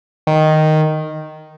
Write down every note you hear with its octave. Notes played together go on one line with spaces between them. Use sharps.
D#3